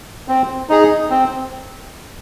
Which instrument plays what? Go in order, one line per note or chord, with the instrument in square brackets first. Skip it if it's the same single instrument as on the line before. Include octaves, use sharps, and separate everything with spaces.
[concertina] C4
D#4 G#4
C4